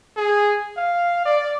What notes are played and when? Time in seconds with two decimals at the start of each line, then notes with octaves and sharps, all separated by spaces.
0.17 G#4
0.77 F5
1.26 D5